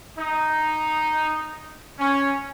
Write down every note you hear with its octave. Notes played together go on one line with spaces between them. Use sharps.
D#4
C#4